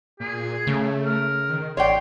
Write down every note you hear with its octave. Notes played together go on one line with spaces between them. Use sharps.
A#2 G#4
C#3 A3
A#4
D#3
A1 C#5 D5 G5 C6